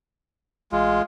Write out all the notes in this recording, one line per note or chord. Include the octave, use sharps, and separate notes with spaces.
A1 G#3 F4